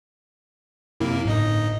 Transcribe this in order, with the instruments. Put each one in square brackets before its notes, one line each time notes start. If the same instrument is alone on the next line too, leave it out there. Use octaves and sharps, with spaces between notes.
[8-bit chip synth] F#2 C3 A#3 [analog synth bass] E4
[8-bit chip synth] G1 D#4 D#5 [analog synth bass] A2